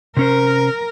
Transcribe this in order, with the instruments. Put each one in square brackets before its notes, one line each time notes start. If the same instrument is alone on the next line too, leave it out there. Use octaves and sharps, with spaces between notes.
[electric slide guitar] C3 C#4 C5 [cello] A#4